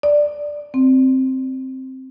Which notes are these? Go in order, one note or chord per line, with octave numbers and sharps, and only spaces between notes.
D5
C4